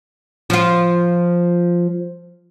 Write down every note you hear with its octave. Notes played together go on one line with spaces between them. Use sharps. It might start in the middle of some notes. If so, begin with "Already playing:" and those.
F3 F4